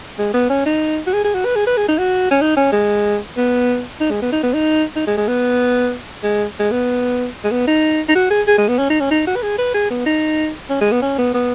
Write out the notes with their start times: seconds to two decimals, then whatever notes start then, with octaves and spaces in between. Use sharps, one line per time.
0.18 G#3
0.34 B3
0.50 C#4
0.66 D#4
1.07 F#4
1.13 G#4
1.25 G#4
1.35 F#4
1.45 B4
1.56 G#4
1.67 B4
1.77 G#4
1.88 D#4
1.98 F#4
2.31 C#4
2.42 D#4
2.57 C#4
2.72 G#3
3.37 B3
4.01 D#4
4.11 G#3
4.22 B3
4.32 D#4
4.43 B3
4.54 D#4
4.96 D#4
5.07 G#3
5.17 G#3
5.28 B3
6.23 G#3
6.60 G#3
6.71 B3
7.44 G#3
7.51 B3
7.68 D#4
8.09 D#4
8.15 F#4
8.31 G#4
8.47 G#4
8.58 G#3
8.68 B3
8.79 C#4
8.90 D#4
9.01 C#4
9.11 D#4
9.27 F#4
9.36 B4
9.43 G#4
9.58 B4
9.74 G#4
9.90 B3
10.06 D#4
10.70 C#4
10.81 G#3
10.92 B3
11.02 C#4
11.18 B3
11.34 B3